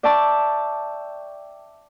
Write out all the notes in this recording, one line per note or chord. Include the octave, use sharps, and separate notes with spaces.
D5 E5 G5 A5 C#6